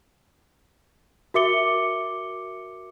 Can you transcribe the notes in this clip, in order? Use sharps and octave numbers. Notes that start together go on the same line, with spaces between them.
F#4 A#4 E5 D6 C#7 G7